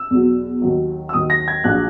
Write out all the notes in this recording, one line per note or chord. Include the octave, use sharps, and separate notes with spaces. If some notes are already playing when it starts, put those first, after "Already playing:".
Already playing: E6
E2 B2 F#3
D#2 D#3 F#3
E6
D#2 D#3 F#3 D#6
A#6
G#6
A#1 A#2 F#3 F#6